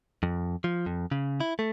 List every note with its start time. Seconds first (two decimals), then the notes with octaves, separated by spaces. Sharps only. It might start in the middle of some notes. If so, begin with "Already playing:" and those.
0.23 F2
0.64 F3
0.86 F2
1.11 C#3
1.40 E4
1.59 A3